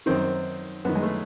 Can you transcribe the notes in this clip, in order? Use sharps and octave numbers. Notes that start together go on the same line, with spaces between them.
F#2 D#3 C4
F#2 D#3 B3
G#3
A3